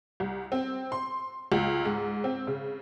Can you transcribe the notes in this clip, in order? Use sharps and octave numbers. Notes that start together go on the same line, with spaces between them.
C2
C4
C6
C#2
G#2
C4
C#3